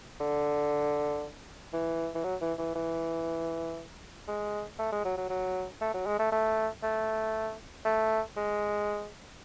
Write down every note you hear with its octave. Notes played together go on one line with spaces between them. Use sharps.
D3
E3
E3
F#3
E3
E3
E3
G#3
A3
G#3
F#3
F#3
F#3
A3
F#3
G#3
A3
A3
A3
A3
G#3